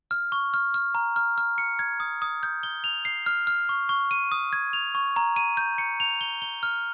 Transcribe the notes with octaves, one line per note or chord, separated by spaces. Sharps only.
F6
C#6
F6
F6
A#5
F6
F6
C#7
G#6
D#6
D#6
G6
G7
F7
C7
F6
F6
C#6
C#6
D#7
D#6
G#6
F7
C#6
A#5
D#7
G6
C#7
F7
G7
G7
F6